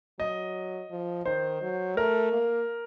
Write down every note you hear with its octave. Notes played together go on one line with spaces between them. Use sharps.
F#3 D#5
F3
D#3 C5
F#3
A3 A#4
A#3